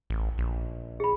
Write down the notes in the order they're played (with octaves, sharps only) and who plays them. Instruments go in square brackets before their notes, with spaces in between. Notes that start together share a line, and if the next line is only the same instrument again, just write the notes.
[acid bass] A1
A#1
[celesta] G#4 B5